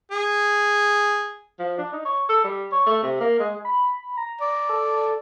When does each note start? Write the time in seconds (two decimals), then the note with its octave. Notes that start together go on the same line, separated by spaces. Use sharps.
0.11 G#4
1.59 F3
1.78 D4
1.93 D#4
2.05 C#5
2.29 A4
2.44 G3
2.72 C#5
2.87 A3
3.03 C3
3.21 A#3
3.40 G#3
3.65 B5
4.17 A#5
4.41 D5
4.69 A4